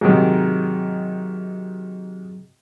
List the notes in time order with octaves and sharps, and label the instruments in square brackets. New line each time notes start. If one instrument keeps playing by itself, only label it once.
[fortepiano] G#2 C3 D#3 [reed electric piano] F#3 F#4 G#4